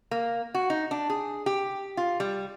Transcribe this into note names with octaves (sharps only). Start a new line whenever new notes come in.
A#3
F#4
D#4
D4
G#4
G4
F4
G3